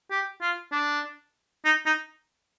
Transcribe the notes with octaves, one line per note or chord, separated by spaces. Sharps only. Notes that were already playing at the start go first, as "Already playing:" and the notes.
G4
F4
D4
D#4
D#4